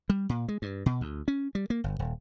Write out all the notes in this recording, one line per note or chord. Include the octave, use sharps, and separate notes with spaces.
G3
A#2
G#3
G2
B2
D2
C#4
G3
A#3
G1
D#1